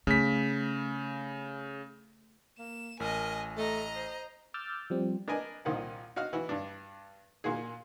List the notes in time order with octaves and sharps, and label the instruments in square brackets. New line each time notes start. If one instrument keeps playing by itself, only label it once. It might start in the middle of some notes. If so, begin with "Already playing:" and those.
[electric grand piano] C#3 B6 [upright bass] A3
[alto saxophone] A#3 [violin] E7
[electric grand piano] A1 [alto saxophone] A#4 [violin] D#5 G#5
[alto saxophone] A3 [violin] D#5 A#5
[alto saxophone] C5
[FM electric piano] D6 E6 F6 G6 A6
F3 G3 C4
[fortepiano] D4 A#4 B4 D#5 G#5
C2 A#2 D#3 F3 F#5
F#4 D#5 F5 F6
E3 F#4
G2 D4
A#2 A#3 F#4 G#4